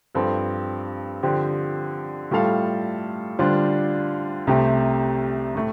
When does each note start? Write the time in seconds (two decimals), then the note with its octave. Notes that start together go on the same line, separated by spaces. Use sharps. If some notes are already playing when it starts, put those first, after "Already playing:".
0.15 G2 F3 C4 A4
1.23 D3 F3 C4 G4
2.31 A2 G3 F4 A4 F5
3.39 D3 G3 D4 F4 C5
4.47 C2 C3 A3 C4 G4
5.55 A2 A3